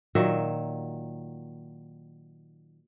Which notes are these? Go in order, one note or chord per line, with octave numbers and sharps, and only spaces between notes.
A#2 D#3 F#3 E5